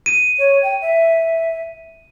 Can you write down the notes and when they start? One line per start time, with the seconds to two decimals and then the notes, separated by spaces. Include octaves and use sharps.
0.06 D#7
0.39 C#5
0.62 G5
0.81 E5